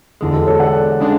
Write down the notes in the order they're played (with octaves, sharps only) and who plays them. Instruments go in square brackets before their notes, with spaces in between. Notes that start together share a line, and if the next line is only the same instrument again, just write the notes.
[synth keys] E2 D3 G#3 [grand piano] E4
[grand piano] F#4 A4
A4 C#5
D5 F#5
[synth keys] C#3 G#3 D4